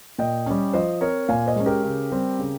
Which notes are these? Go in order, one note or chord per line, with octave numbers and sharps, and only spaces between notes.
A#2 D#5 G5
G3 C#4
F3 C5 D#5
C4 A#4 C#5
A#2 F5 G#5
C5 D#5
G#3 C#4
G4 A#4
C#3
G3 C4
C#3